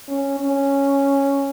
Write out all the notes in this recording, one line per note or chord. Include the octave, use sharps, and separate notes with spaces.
C#4
C#4